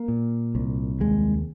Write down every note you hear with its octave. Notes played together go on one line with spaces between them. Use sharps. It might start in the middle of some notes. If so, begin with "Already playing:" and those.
Already playing: A#3
A#2
C2
D#2 G#3